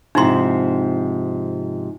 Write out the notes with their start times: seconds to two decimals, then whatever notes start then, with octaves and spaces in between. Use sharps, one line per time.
0.15 G#2 C3 F3 D#4 E4 C6